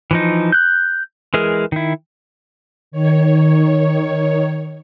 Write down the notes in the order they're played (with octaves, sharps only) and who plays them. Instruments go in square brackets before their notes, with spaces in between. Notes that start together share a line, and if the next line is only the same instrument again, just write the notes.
[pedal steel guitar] E3 F3 D#4
F#6 G6
E3 G#3 G#4 A#4
D#3 E4
[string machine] D#3 C#5